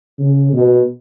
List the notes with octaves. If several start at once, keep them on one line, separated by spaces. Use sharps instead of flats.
C#3
B2